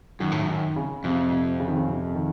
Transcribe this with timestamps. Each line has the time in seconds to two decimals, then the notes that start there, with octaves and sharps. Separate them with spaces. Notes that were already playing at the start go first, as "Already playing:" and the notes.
0.20 F#2 D#3
0.32 A2
0.42 F#2
0.48 D#3
0.76 C#3
1.04 F2 C3
1.31 C3
1.60 C#3
1.68 D#3
1.76 C#3
1.88 C3
2.15 D#3